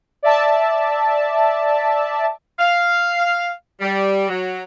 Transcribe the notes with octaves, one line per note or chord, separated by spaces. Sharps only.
D5 E5 A5
F5
G3
F#3